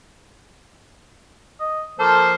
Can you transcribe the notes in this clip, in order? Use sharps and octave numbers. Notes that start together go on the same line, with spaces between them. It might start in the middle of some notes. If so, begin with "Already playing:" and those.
D#5
F3 A#3 A4 C5